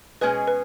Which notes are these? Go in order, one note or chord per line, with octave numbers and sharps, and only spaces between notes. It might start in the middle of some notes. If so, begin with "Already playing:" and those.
B2 G#3 C#4 G#4 B4 D#5
B4